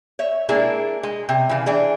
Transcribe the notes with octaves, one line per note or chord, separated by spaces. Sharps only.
C#5 E5
G#3 A#3 D4 E4 G#4
G#3
C3
C#3 E3
E3 D4 G#4